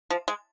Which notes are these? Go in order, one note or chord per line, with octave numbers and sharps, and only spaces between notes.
F3
G#3